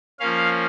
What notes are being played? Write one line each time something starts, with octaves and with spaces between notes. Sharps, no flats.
F3 A#3 C#4 F5